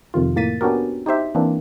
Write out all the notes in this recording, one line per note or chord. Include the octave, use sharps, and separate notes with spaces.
F2 C3 D#3 F4
A2 A#3 A6 B6 D#7
B3 C#4 D4 F#4 G4 A#4
D#4 G4 C5 E5
E3 A#3 C4 D4